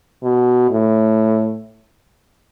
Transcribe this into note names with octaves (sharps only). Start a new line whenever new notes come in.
B2
A2